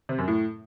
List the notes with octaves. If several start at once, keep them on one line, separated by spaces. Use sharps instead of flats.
C3
F#2
A2